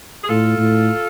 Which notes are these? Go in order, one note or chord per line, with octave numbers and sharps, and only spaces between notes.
G#4
A2 F4 A4
A2